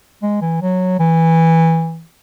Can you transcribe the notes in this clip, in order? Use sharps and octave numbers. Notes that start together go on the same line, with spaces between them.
G#3
E3
F#3
E3